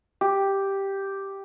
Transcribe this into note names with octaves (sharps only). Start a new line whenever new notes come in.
G4